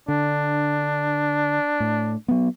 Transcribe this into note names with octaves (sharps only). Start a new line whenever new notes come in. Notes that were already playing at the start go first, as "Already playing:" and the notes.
D3 D4
A2
F#3 B3